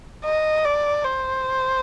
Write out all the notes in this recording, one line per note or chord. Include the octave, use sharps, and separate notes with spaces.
D#5
D5
C5